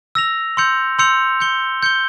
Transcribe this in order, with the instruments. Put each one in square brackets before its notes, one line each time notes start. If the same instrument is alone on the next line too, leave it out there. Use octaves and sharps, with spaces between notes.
[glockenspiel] E6 A#6 F7
C6 E6 G6 C#7 F7
C6 E6 G6 C#7 F7
G6 C#7 G7
G6 C#7 G7